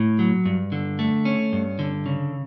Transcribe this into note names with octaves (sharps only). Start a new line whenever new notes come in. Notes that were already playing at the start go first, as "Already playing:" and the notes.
Already playing: A2
F#3
G2
D3
A3
C#4
G2
D3
C#3